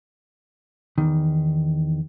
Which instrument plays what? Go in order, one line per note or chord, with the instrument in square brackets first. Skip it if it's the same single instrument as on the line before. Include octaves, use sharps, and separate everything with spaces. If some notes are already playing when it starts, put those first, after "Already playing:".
[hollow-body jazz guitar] E2 D#3